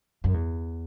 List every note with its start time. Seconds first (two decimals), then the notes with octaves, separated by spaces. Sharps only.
0.24 F#2
0.34 E2